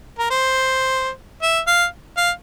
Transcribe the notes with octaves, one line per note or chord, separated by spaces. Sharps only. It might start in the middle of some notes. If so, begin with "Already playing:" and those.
A#4
C5
E5
F5
F5